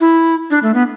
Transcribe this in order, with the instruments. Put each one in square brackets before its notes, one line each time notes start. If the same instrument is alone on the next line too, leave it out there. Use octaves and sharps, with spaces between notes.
[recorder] E4
D4
A3
B3